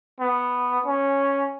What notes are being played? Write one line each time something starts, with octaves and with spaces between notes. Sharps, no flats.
B3
C#4